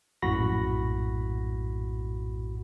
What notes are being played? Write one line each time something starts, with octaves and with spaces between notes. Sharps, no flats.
A#1 F#2 A2 F#4 B5 A#6